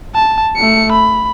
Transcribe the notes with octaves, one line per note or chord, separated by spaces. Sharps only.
A5
A3 C#7
B5